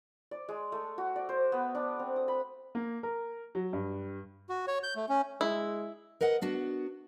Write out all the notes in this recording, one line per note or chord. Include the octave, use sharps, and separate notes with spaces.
D5
G#3
A3
F#4
D5
C5
B3
D4
C4
D#6
B5
A#3
A#4
F#3
G2
F#4
C#5
G6
A3
C#4
G#3 E4
A#4 B4 D#5 F#5
B3 D4 F#4